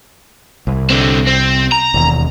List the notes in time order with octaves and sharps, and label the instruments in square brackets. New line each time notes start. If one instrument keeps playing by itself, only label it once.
[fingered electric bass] C2
[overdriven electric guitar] D3 C4
C4
A#5
[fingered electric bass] E1 D#2